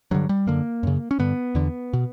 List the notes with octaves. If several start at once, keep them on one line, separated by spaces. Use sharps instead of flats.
G2 D3 F#3
G3
F#2 D3 A#3
F#2 C#3
C#4
G2 D3 B3
E2 D3
B2